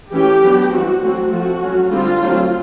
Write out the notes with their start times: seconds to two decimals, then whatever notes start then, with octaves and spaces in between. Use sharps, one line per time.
0.13 E3 A3 C#4 G4
0.43 F#3 B3 D4
0.73 E3 G3 C4 F#4
1.02 F#3 A3 C4
1.32 F3 A3 C4 F#4
1.61 F#3 A3 C#4
1.90 D3 G3 C4 F4
2.20 F#3 A3 C4